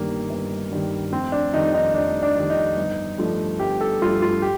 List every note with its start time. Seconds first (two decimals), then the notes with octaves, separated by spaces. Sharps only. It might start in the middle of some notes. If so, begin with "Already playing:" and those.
Already playing: G1 G2 D#3 G3 A#3
0.30 G1
0.71 G2 D#3 G3
1.12 F1 C4
1.32 D4
1.53 F2 D#3 G3 D#4
1.74 D#4
1.94 F1 D4
2.23 D4
2.35 F2 D#3 G3
2.50 D#4
2.77 G1
3.18 G2 F3 A3
3.60 G1 G4
3.81 A4
4.02 G2 F3 A3 F4
4.22 F4
4.42 G4